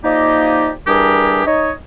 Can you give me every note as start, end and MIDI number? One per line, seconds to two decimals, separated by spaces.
0.04 0.71 53
0.04 0.71 58
0.04 0.71 63
0.04 0.71 67
0.04 0.71 74
0.04 0.71 75
0.87 1.43 52
0.87 1.43 55
0.87 1.43 62
0.87 1.43 67
0.87 1.43 68
0.87 1.43 70
1.46 1.72 63
1.46 1.72 73
1.46 1.72 75